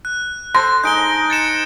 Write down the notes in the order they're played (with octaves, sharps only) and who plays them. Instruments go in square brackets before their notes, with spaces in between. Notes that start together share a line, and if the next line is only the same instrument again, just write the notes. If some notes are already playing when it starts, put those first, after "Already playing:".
[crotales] F#6
[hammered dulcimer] A4 C5 [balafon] C6 [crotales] A#6
[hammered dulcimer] G#3 D#4 [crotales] G6 D7 G7
[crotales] A6 C#7 E7